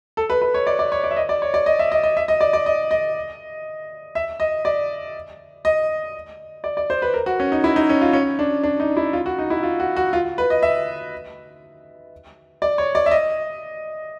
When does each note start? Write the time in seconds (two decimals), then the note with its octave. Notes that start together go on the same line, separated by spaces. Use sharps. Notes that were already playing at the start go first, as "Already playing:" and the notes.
0.17 A4
0.30 B4
0.42 B4
0.54 C#5
0.67 D5
0.79 D5
0.92 C#5
1.04 D5
1.11 E5
1.17 D#5
1.29 D5
1.42 C#5
1.54 D5
1.66 D#5
1.79 E5
1.92 D#5
2.03 D#5
2.17 E5
2.28 D#5
2.40 D5
2.53 D5
2.66 D#5
2.91 D#5
4.15 E5
4.40 D#5
4.65 D5
5.65 D#5
6.64 D5
6.77 D5
6.90 C5
7.02 B4
7.14 A#4
7.26 F#4
7.40 C#4
7.52 D#4
7.64 E4
7.76 D#4
7.89 C#4
8.01 F4
8.13 C#4
8.39 D4
8.63 D4
8.80 D#4
8.97 E4
9.13 F4
9.26 F#4
9.39 D#4
9.50 E4
9.63 F4
9.80 F#4
9.96 F#4
10.13 F4
10.38 B4
10.50 D#5
10.63 E5
12.62 D5
12.78 C#5
12.95 D5
13.06 E5
13.11 D#5